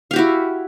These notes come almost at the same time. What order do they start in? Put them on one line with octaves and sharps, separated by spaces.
F5 G4 F#4 E4